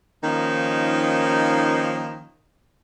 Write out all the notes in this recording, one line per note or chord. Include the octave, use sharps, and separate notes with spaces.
D#3 F3 A#3 C#4 D#4